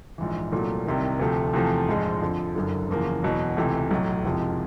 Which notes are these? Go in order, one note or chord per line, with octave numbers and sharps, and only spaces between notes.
A#1 G#2 E3
C2 A#2 F#3 A3
C2 C3 D#3
D2 C3 F3 A3
E2 C3 F3 A3
A#1 G#2 F3 G#3
F2 D3 F3
F#1 F#2 D3
F#1 E2 C#3 F3 A#3
E1 E2 B2 F#3
C#2 C3 E3 A3
B1 A2 F#3
F#1 F2 C3 F3 G#3